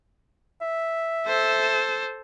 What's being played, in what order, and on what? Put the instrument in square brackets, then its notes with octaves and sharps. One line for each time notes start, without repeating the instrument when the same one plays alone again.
[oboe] E5
[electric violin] A4 C5